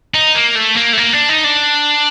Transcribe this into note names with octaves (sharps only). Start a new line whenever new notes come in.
D#4
A#3
A3
A#3
A3
A#3
D4
D#4
D4